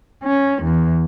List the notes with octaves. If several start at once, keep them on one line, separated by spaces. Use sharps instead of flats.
C#4
E2